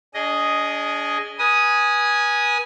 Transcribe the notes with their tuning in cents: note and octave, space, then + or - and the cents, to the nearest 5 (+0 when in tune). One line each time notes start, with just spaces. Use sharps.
D4 -35 G#4 +0 D#5 +0
B4 -35 G#5 +0 D#6 +0